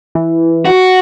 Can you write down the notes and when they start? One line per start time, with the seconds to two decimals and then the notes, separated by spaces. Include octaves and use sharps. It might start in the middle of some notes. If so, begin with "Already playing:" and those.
0.15 E3
0.65 F#4